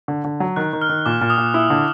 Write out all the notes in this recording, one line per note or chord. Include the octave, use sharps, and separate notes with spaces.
D3
D3
F#3
D#3 F#6
D#3
F6
D#3
A#2 D6
A#2
D#6
A#2
E4 E6
D3